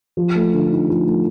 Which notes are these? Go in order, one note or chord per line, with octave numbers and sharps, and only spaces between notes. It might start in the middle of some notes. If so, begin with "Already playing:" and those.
F3
A3
D3
D#4
F3
A3